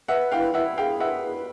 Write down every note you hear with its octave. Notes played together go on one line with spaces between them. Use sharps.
B4 E5 F#5
E4 F5 G5
E4 E5 F#5
G#4 F5 G5
B4 E5 F#5
E4